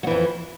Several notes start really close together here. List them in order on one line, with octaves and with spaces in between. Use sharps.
F#3 E3 F2